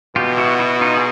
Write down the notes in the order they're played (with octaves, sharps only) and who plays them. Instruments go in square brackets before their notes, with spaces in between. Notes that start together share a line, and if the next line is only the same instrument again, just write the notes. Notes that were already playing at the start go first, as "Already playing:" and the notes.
[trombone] B2 [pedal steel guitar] F4 G4
[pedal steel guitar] E4 F#4
E4 F#4
D#4 F4
G#4